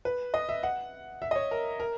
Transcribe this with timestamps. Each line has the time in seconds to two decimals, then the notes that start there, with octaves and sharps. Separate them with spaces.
0.05 B4
0.34 D#5
0.49 E5
0.63 F#5
1.22 E5
1.31 D#5
1.36 C#5
1.51 A#4
1.80 A#4